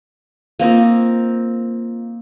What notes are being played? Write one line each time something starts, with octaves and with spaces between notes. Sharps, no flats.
A#3 C4 D#4 F4